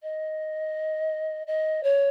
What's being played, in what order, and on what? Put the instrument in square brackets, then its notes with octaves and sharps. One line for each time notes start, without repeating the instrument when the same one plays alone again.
[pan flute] D#5
D#5
C#5